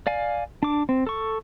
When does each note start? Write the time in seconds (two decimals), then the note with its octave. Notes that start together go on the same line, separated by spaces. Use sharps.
0.07 D5 F5 G#5
0.63 D4 D6
0.89 C4
1.07 A4 C#6